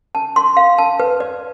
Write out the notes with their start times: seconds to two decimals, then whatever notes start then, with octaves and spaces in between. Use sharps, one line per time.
0.15 A5
0.36 C6
0.57 F5
0.78 A5
1.00 B4
1.20 D5